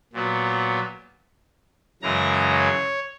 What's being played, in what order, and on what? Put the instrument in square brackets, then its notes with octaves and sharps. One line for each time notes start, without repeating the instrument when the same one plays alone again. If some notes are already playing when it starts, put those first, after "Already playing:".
[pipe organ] A#2 F#3 B3
F#2 C#3 E3 G#3 A#5
C#5